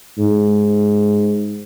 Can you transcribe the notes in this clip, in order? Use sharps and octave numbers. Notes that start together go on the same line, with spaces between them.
G#2